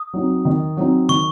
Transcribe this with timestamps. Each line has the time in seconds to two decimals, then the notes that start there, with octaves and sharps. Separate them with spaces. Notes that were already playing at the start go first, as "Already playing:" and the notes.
Already playing: D#6
0.13 F#3 C4 D#4
0.45 D#3
0.77 F#3 C4 D#4
1.09 D#3 C#6